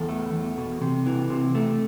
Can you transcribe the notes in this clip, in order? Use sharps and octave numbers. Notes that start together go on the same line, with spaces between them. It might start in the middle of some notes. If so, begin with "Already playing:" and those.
Already playing: E2 A4
A3
E2
B2
C3
E3
C3
A3